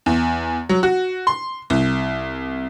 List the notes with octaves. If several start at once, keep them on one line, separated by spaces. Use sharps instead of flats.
E2
F#3
F#4
C6
C2